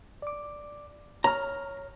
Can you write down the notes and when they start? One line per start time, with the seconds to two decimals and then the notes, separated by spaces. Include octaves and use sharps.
0.22 D5 D6
1.24 C#5 A#5 F6